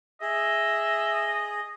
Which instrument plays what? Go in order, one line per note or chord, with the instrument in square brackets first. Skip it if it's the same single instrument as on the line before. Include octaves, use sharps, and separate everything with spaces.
[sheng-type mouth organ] G#4 [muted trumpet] D#5 [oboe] E5